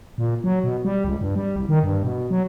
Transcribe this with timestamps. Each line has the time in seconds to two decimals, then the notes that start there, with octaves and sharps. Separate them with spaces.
0.18 A#2
0.44 F#3
0.64 B2
0.85 G3
1.05 C#2
1.21 G2
1.36 G3
1.56 C2
1.69 D#3
1.83 G2
2.03 B2
2.30 F#3